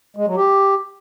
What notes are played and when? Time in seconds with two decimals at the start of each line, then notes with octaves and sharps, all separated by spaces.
0.16 G#3
0.27 F#3
0.37 G4